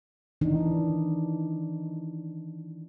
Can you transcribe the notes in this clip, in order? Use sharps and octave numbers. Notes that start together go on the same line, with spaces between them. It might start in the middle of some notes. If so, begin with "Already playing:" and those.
D#3 E3 D4 D#4